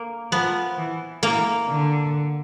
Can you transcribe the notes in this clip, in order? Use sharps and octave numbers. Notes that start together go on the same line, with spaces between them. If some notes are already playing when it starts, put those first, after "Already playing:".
Already playing: A#3
F3 B3
E3
E3 A#3
D3